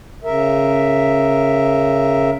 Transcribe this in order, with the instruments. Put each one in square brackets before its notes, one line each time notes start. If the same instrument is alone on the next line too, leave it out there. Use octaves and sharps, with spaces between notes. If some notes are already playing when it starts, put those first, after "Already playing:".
[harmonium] C#3 A#4 E5